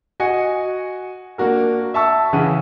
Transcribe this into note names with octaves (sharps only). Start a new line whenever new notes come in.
F#4 D#5 G#5 C#7
A#3 D4 F#4 A#4
E5 A5 C#6 E6
C#3 E3 C#4 F#5 D#7